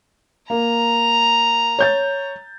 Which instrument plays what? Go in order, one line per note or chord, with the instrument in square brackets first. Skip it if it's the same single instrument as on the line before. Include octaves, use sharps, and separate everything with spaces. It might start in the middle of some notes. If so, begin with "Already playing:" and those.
[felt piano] A#3 [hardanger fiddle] A#5
[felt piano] C#5 G6 A6